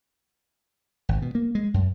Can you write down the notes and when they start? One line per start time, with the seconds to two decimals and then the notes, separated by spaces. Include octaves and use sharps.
1.09 G#1
1.22 B2
1.35 A#3
1.55 G#3
1.74 F#2